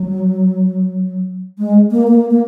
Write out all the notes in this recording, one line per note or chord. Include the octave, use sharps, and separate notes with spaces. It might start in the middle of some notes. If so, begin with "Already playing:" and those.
Already playing: F#3
G#3
A#3
A#3
A#3